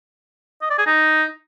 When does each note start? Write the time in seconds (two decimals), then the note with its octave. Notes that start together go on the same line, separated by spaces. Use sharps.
0.62 D#5
0.70 D5
0.79 G#4
0.87 D#4